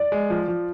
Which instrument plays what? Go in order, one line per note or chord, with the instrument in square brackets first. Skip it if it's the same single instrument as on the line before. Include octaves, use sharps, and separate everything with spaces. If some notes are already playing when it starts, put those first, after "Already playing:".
Already playing: [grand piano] D5
[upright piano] G#3
F3
F3